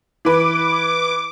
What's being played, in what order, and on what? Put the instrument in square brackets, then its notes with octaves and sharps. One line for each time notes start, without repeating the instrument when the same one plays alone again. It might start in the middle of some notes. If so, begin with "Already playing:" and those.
[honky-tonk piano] E3 B4 [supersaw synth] D6